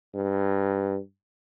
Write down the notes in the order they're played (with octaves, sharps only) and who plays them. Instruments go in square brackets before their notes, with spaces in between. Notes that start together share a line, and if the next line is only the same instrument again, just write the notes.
[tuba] G2